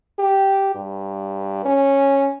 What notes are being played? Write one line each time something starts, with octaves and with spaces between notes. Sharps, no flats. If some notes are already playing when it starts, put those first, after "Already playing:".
G4
G2
C#4